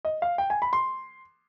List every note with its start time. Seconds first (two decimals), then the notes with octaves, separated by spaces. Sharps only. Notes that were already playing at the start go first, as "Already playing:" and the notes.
0.05 D#5
0.22 F5
0.38 G5
0.50 G#5
0.62 B5
0.73 C6